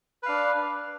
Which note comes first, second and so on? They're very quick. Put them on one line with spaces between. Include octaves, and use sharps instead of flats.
B4 F5 D4